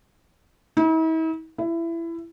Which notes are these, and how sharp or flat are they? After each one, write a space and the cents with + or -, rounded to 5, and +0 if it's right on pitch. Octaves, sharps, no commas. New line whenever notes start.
E4 -45
E4 +20